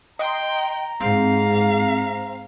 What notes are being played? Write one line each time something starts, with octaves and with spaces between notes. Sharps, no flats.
D#5 G5 A#5 C6
G#2 C4 F5